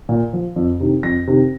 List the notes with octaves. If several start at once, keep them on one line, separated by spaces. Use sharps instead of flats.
A#2
F3
F2
C3 D#3
F2 A#6
C3 D#3